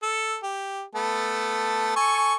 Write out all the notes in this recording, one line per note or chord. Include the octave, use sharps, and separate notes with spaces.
A4
G4
A3 B3 A5
A4 G#5 C#6